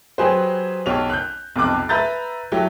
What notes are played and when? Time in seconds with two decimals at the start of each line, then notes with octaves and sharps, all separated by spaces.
0.18 F#3 G4 G#4 B4 C5
0.86 B1 G4 C#5 F7
1.10 F#6 G6
1.56 B1 F2 C3 D6 F#6
1.89 B4 E5 A#5 G6 A6
2.52 F#3 A3 E4 G4